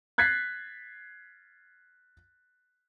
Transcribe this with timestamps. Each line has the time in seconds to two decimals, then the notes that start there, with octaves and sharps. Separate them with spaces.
0.18 F#6 G#6 A6 B6 C7